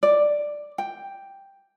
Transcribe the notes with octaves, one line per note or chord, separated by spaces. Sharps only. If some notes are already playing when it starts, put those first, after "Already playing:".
D5
G5